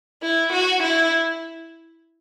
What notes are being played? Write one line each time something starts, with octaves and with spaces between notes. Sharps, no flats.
E4
F#4
E4